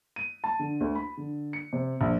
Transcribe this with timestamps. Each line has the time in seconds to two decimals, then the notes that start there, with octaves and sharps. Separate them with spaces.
0.16 D#7
0.44 A5
0.59 D3
0.81 D2
0.95 B5
1.17 D3
1.53 C#7
1.73 C3
2.01 A#1